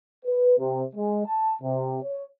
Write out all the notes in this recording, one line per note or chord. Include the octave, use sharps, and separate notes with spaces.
B4
C3
G#3
A5
C3
C#5